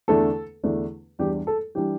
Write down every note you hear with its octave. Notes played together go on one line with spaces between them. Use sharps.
E2 D3 A3 D4 A4
E2 D3 A3 D4
E2 E3 G3 D4 G4
A4
E3 G3 D4 G4